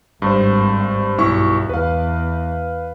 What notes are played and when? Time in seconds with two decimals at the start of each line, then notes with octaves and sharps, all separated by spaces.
0.22 G#1 G2 C5
1.18 B1 G2 E4 C#6
1.69 E2 B4 F5